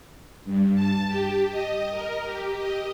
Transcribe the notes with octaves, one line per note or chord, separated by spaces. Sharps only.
G2
A5
G4
D#5
A#4
G4
D#5